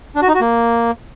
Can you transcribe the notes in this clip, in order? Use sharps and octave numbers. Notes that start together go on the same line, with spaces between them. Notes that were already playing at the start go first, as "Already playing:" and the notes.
D4
F#4
D#4
F#4
A#3